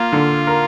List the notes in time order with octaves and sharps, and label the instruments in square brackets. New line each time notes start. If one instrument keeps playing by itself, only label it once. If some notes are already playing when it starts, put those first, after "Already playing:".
Already playing: [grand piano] A#3 [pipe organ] F4
[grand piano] D3
A#4